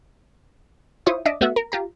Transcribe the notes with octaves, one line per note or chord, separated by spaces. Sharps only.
E4 F4 C5 C#5 E5 D#6
D4 D#5 E5 D6
A3 B3 F#4 E5
A#4
F4 G4 A#5